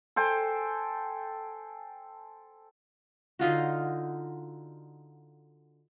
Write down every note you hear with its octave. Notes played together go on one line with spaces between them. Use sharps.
A4 C5 G5 G#5
D3 D#4 F4 F#4